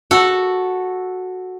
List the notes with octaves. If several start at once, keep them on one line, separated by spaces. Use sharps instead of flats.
F#4 A4